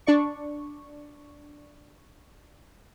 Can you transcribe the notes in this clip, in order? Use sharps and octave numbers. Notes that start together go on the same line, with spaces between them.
D4 D5 C#6